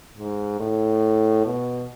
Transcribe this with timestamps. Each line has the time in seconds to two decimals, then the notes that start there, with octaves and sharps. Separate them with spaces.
0.18 G#2
0.60 A2
1.46 B2